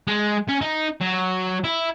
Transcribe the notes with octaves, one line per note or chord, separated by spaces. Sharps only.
G#3
C#4
D#4
F#3
E4